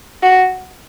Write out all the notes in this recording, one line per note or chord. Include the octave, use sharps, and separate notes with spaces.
F#4